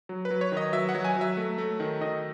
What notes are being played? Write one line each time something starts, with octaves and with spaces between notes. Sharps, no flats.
F#3
B4
F#3
C#5
D#3
D#5
F#3 E5
F#5
F#3
G#5
F#3 E5
A3
A3
D#3
D#3 D#5